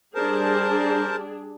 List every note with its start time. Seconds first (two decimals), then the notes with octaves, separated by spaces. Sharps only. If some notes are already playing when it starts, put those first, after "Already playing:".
0.15 G3 D4 G#4 A#4 C5 A5